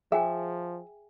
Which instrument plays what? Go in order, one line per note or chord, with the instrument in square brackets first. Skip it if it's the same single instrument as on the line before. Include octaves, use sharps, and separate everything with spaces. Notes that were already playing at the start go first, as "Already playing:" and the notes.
[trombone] F3 [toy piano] G#4 G5 G#5 [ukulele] E5